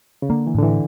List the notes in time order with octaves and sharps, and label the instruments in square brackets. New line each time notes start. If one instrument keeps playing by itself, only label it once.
[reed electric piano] C#3
[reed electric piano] D3 [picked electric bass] A#3
[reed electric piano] E3
[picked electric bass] A2 [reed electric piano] D3
[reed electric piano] E3